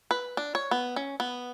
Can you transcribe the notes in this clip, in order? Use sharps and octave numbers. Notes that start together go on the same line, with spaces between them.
B4
D4
C#5
B3
C#4
B3